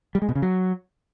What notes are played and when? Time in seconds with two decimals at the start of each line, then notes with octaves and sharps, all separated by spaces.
0.15 G3
0.22 G#3
0.29 B2
0.35 C#3
0.42 F#3